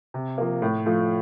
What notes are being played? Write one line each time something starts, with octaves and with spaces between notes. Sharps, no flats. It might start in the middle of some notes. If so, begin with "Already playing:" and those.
C3
F3 A#3
A2
F3 A3